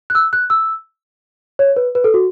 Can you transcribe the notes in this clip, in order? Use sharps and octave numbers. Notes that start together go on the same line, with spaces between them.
F#6
E6
F#6
E6
C#5
B4
B4
A4
F#4